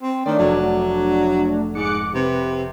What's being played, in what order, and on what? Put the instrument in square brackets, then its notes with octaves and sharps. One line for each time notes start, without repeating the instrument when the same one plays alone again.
[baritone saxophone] C4
[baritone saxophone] D#3 [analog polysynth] A3 D4 [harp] D5
[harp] F1 [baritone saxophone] F#3
[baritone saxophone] G#2 [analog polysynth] D6 F#6 C#7
[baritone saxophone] C3 [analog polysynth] B4